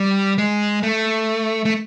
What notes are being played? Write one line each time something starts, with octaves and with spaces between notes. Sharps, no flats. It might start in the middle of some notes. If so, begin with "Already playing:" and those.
Already playing: G3
G#3
A3
A3